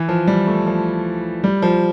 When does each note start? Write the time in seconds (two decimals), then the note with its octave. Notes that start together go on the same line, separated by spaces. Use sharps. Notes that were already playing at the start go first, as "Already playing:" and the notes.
Already playing: E3
0.09 F3
0.27 G3
0.47 A3
0.66 F3
1.44 G3
1.62 F3